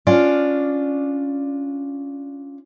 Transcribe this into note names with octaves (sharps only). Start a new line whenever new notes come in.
C#4 D4 F4 D5